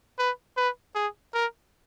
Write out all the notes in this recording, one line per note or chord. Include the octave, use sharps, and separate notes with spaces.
B4
B4
G#4
A#4